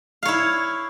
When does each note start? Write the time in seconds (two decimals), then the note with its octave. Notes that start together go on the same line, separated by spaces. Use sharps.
0.23 F5
0.25 C#5
0.28 E4